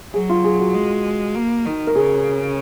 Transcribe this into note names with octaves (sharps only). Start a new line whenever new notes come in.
F#3 G#4
F4
G#4
F#4
G#3
A#3
D#3
A#4
C#3 G#4